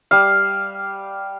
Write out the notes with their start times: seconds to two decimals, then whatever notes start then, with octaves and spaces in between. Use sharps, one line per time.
0.11 G3 F5